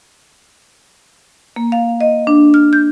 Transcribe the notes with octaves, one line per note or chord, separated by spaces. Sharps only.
A#3
F5
D#5
D4
F6
G6